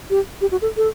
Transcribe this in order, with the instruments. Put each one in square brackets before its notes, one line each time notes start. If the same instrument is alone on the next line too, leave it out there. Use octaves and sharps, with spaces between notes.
[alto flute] G4
G4
F#4
A4
A4